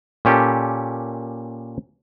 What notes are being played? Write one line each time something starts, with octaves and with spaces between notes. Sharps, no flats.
A#2 C#4 G4 A4